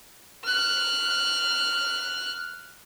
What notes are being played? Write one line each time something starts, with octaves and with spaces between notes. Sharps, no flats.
F6 F#6